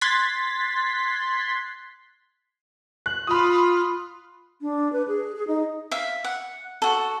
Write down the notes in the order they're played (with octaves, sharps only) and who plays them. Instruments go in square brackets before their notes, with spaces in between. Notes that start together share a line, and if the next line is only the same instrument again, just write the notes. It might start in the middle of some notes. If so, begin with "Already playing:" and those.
[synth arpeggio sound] C6 F#6 G#6 A6 B6
[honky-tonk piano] F#6
[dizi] F4 [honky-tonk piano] B5 D#6
[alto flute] D4
B4
G#4
G#4
D#4
[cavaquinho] E5 F5
F#5
F#4 A4